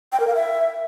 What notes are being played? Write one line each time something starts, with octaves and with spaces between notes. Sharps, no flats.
G5
A#4
F5
E5